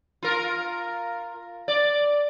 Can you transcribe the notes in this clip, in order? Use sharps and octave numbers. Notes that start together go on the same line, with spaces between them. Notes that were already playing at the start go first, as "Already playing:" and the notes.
F4 A#4
D5